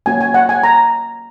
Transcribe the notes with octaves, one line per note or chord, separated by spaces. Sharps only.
A#3 C#4 F#4 G#5
G#5
F#5
G#5
A#5